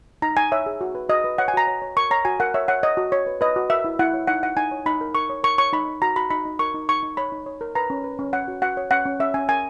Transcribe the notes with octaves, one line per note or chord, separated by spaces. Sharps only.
D#4 A#5
D#4 G#5
C#5 E5
G#4
F#4
B4
F#4 D#5
B4
C#5 F#5
G#5
F#4 A#5
C#5
C#5
A#4 C#6
C#5 A#5
F#4 G#5
A#4 F#5
C#5 E5
C#5 F#5
C#5 D#5
F#4
F#4 C#5
B4
B4 D#5
F#4
A#4 E5
E4
E4 F#5
C#5
D#4 F#5
D#4 F#5
D#4 G#5
C#5
D#4 B5
A#4
A#4 C#6
C#5
A#4 C#6
C#5 C#6
D#4 B5
D#4
F#4 A#5
F#4 B5
D#4 B5
D#4
A#4 C#6
D#4
D#4 C#6
D#4
C#5 B5
D#4
C#5
A#4
B4 A#5
C#4
B4
C#4
C#5 F#5
F#4
F#4 F#5
C#5
C#4 F#5
C#4
C#4 E5
C#4 G#5
A#4 G#5